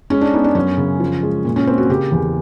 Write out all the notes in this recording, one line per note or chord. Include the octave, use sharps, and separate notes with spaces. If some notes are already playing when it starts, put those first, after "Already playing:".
G#3 C#4
D4
B3 D#4
D4
F#2 C#4
C#3
F3
G#3
A#2
C#4
A#3 C4
F#4
C#3 G4
E2